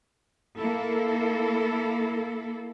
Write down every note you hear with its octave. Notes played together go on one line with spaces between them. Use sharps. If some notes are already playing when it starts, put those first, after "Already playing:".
A#3 E4 A4